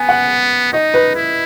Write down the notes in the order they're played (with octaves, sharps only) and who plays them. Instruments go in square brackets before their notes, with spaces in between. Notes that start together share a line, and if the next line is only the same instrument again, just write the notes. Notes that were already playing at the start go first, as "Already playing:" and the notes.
Already playing: [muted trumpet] B3 [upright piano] G#5
[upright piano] F#5
[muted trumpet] D#4 [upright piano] D#5
[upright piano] B4
[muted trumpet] E4